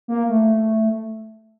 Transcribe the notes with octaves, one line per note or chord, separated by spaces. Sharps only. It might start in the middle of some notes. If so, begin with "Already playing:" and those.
A#3
A3